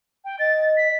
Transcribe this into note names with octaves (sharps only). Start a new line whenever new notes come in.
G5
D#5 A6
B6